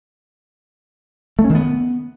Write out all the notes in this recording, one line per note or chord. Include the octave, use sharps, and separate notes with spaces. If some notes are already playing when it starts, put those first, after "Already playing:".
A3
C#4
D#3
B3